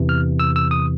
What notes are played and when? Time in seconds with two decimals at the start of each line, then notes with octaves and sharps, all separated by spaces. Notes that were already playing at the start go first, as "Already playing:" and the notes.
Already playing: E2 C3 E3
0.09 F6
0.40 E6
0.56 E6
0.71 D#6